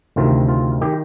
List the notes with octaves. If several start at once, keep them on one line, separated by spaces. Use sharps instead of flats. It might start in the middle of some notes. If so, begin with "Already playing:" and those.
D2 C3 D#3 F4
F4
D#3 G4